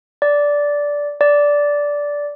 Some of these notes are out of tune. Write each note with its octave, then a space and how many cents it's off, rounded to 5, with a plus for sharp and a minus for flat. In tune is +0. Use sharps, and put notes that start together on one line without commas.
D5 -10
D5 -10